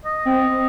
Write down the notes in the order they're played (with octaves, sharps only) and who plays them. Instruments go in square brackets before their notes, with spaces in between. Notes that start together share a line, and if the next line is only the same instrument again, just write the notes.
[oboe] D#5
[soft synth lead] C4
C4